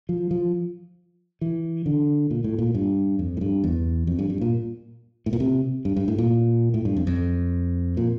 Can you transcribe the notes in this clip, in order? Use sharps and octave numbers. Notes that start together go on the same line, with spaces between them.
F3
F3
E3
D3
A#2
A2
A#2
G2
F2
A2
G2
E2
F2
G2
G2
A#2
A2
A#2
C3
G2
G2
A2
A#2
A2
G2
F2
F2
A#2